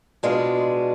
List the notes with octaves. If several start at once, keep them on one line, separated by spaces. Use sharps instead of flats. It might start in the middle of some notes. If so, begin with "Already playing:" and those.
B2 G#3 D4 F4